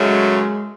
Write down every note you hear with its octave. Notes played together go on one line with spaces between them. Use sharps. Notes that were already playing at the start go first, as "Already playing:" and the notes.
Already playing: F#2 C#3 F#3 G#3 A3